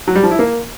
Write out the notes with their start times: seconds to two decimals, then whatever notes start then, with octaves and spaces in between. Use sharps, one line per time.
0.08 F#3
0.15 G3
0.23 F3
0.31 E4
0.39 A#3